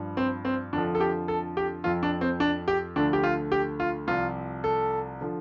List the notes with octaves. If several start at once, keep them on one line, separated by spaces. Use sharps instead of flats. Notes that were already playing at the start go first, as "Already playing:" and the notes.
Already playing: G2 F3
C4
C4
F2 D3 F3 D4
A4
G4
A4
G4
F2 F3 F4
D4
C4
D4
G4
D2 D3 F3 D4
G4
F4
G4
F4
C2 C3 F3 F4
A4
D3 F3